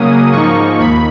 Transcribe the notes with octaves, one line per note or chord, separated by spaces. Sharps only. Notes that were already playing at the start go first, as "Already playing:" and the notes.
Already playing: C#3 F#3 A#3 C#4 D#6
G#2 F3 A#3 D#4 C#6
D#2 B5